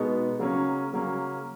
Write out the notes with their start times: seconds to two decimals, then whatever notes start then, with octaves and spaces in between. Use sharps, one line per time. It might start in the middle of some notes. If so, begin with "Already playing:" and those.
Already playing: B2 G#3 B3 D#4
0.39 C#3 F#3 A#3 C#4
0.93 C#3 F#3 A#3 C#4